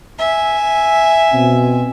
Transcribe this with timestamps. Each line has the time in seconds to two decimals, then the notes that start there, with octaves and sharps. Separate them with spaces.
0.19 E5 G#5
1.33 B2 C4